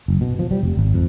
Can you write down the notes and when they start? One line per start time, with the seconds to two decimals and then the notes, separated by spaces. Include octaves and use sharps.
0.08 F#1
0.21 B2
0.39 F3
0.51 G3
0.63 F1
0.77 G#1
0.94 F2